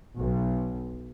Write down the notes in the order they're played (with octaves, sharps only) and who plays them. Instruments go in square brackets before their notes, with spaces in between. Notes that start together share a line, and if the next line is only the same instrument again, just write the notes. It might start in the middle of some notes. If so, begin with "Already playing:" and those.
[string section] B1